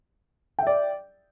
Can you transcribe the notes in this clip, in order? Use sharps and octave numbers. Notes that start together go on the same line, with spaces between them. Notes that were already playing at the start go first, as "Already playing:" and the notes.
D5 E5 G5